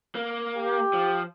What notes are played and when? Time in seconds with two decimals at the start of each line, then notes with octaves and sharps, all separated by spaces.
0.15 A#3
0.57 G4
0.93 F3